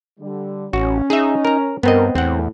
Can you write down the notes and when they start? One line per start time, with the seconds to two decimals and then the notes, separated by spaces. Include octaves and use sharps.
0.20 D3 G3
0.73 A1 C#4 F#4
1.10 D#4 G#4 E5
1.45 A#4 A#5
1.83 G2 B3 C4 A#4 D#5
2.15 E2 A2 C4 F#5